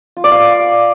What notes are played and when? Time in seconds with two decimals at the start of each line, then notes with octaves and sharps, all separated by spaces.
0.17 F4
0.24 D5
0.31 F5